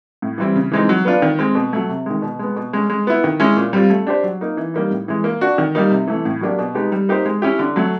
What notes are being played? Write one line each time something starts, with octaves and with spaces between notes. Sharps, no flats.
A2
E3 G3 C4 E4
C#3
E3 G#3 C4 D#4
F#3
B3 D4 F4
D#3
G#3 C4
B2
F#3 A3
C3
D#3 G#3
B2
G#3 B3
B2
G#3 C#4
G#3
B3 E4
D#3
G#3 C#4 E4
A#2
G3 C4 F4
A3
D4 G4 C5
F#3
A#3 D#4
E3
G3 A#3 D#4
A2
E3 G#3
A#3
D4 F#4
D#3
G3 A#3 D#4
C3
E3 A3
A2
F#3 A#3 D4 G4
B2
G#3 B3 D#4 G4
G3
A#3 D#4 G4 C5
G#3
C#4 E4 G4
D3
F#3 A3